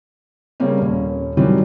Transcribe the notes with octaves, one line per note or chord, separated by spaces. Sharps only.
C#3 G3 A#3 C4 C#4
D#1 C#4
D#3 E3 F#3 G3 C4